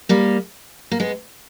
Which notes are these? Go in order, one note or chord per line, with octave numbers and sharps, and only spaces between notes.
G3 A#3
A#3
G#3 B3